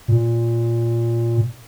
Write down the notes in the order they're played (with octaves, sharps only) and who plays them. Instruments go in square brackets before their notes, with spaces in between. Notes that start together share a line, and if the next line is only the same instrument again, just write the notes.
[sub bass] A#2